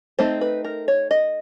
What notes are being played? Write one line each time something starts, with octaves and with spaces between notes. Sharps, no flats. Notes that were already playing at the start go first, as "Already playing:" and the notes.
A3 C4 D#4 C5
B4
A#4
C#5
D#5